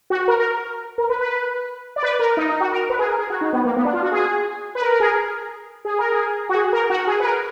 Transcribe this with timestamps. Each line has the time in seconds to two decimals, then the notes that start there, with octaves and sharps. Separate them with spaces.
0.10 F#4
0.28 A#4
0.40 A#4
0.98 A#4
1.09 B4
1.21 B4
1.96 D5
2.03 B4
2.19 A#4
2.37 D#4
2.49 D#4
2.60 F#4
2.72 A#4
2.90 B4
2.99 G#4
3.07 A#4
3.18 G#4
3.30 F#4
3.41 D#4
3.53 B3
3.65 A#3
3.77 B3
3.85 D4
3.93 F4
4.03 F#4
4.12 G#4
4.75 B4
4.81 A#4
4.92 A#4
5.00 G#4
5.04 A#4
5.85 G#4
5.99 A#4
6.12 G#4
6.49 F#4
6.55 G#4
6.73 A#4
6.90 F#4
7.07 G#4
7.20 B4
7.24 A#4